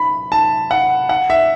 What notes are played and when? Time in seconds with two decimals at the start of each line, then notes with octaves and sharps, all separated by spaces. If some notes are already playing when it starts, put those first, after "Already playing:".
Already playing: B5
0.32 A5
0.71 F#5
1.09 F#5
1.30 E5